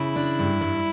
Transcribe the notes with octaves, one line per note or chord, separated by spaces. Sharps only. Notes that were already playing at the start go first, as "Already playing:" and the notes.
Already playing: C#3 E4
D4
G2
G2